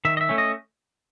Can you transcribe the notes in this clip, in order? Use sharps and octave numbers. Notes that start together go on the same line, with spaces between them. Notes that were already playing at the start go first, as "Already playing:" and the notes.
D#3 E5
D#5
E5
A3 C#4
D#5